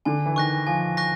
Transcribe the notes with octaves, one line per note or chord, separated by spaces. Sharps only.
D3 G#5
E3
D#3 C#6 F#6 A#6
F3 G#5
C#6 F#6 A#6